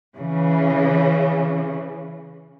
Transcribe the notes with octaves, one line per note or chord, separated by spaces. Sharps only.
C#3 E3